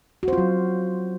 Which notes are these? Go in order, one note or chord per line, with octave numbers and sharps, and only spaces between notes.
F#3 F4 F#4 C5